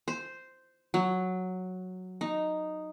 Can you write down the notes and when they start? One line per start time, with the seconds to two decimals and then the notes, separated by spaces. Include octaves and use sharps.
0.08 C5
0.94 F#3
2.21 D#4